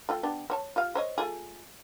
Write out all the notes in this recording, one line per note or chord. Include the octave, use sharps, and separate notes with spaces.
A3 F4 G5
B3 D4 G4
C4 C#5 A5
F4 G4 F5
C5 C#5 D#5
A3 F4 G#4